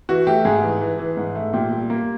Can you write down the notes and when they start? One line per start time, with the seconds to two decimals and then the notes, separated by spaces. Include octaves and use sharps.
0.09 E3 F#4
0.27 A3 G4
0.45 G#2 G#4
0.63 E3
0.81 E3
0.99 E3
1.17 G#2
1.35 A3
1.54 A#2 G4
1.72 G3
1.90 A#3